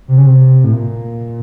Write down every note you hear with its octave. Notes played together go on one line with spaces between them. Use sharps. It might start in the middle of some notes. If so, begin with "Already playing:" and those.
C3
C#3
C3
A2
A#2